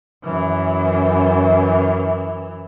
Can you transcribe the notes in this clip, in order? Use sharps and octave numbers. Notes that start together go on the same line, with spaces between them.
F#2 E3